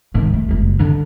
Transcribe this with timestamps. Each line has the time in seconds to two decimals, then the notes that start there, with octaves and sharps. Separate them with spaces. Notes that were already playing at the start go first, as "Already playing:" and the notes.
0.14 G#2 D#3
0.34 A3
0.48 F#1 G#3
0.79 D3 D4